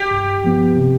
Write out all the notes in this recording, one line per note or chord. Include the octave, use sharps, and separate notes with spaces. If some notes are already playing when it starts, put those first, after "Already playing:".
Already playing: G4
G2
F3 B3
C3